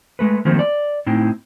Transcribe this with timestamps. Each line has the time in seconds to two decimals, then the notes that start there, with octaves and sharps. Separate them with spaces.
0.19 G#3 A3 B4
0.45 D#3 F3 F#3 A3 A#3 C4
0.59 D5
1.06 A2 C4 D#4 E4